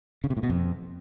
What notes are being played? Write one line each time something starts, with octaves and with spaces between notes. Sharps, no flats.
C#3
C3
A2
B2
F2